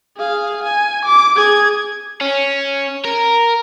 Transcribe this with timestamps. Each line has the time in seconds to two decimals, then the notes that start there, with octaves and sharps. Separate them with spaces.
0.17 G#4 F5
0.64 G#5
1.05 D6
1.36 G#4 G#6
2.21 C#4
3.05 A#4